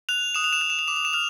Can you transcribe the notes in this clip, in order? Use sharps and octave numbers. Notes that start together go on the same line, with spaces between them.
F#6 F7
D#6 E7
F7
E7
F#6 F7
E7
F7
D6 E7
F7
E7
F6 F7